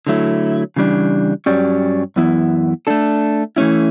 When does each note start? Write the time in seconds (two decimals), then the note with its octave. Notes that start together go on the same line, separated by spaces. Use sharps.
0.07 D3 F#3 A3 E4
0.76 C#3 E3 G3 D4
1.46 G2 F#3 C#4 G4 D5
2.16 F#2 E3 B3 E4
2.87 A3 D4 A4
3.56 E3 A3 C#4 E4